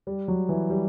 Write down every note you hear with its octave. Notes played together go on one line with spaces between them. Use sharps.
G3
F#3
E3
G3